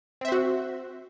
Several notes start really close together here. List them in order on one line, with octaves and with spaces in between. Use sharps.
C4 E5 C5 F#4